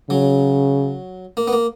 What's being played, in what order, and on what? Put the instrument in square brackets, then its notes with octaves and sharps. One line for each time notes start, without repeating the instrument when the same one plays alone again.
[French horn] C#3 [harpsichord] F#3
[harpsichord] A#3
B3
A#3